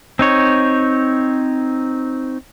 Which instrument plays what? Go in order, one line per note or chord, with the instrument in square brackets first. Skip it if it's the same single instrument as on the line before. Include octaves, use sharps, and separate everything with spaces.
[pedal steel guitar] C4 D#4 C#5